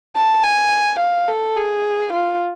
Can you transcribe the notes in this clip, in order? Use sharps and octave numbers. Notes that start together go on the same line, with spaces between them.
A5
G#5
F5
A4
G#4
F4